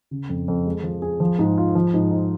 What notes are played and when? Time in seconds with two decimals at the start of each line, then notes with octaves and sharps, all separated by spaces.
0.11 C#3
0.29 F2
0.48 F2
0.66 G#3
0.83 F3
1.02 G#4
1.20 F3
1.39 G#2
1.58 F4
1.75 F3
1.94 G#2
2.11 D#4